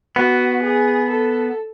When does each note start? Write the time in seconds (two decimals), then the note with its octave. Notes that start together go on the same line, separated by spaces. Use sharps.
0.16 B3 F#4
0.63 G#4
1.10 A4